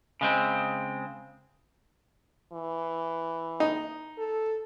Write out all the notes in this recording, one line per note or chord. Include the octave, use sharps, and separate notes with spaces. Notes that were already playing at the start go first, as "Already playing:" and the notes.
C#3 G#3 C4
E3
D#4
A4